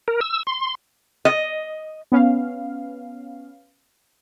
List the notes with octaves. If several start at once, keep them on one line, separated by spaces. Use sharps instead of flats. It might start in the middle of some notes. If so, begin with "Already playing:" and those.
A#4
E6
C6
D#5
B3 C#4 F5